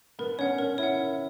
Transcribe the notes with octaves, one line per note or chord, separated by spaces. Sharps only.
B3 A#4
C#4 C#5 F#5
C#4 A#4
E4 C#5 F#5
A#4